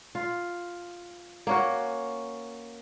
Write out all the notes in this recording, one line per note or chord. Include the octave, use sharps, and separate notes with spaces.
F4
A#3 C#4 F#4